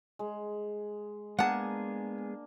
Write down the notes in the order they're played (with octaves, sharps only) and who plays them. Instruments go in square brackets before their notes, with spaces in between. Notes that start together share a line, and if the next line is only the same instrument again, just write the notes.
[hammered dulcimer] G#3
[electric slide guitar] G#3 B3 G#4 [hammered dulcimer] A#3 D4 [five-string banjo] F#5 A5